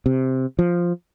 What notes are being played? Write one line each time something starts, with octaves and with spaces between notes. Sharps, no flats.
C3
F3